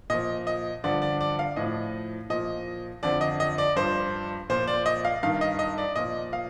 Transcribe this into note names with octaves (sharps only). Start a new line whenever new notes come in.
A#2 F3 D#5
D#5
G2 D3 F3 D5
D5
D5
F5
A2 F3 D#5
A#2 F3 D#5
F2 D3 F3 D5
D#5
D#5
D5
G2 F3 C5
A#2 F3 C5
D5
D#5
F5
G2 D#3 F5
D#5
D#5
D5
A#2 F3 D#5
F5